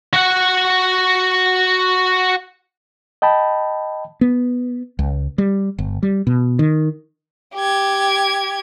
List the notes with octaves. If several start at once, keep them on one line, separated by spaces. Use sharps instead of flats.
F#4 F#5
D#5 G5 A5 B5
B3
C#2
G3
G1
G3
B2
D#3
G4 G#6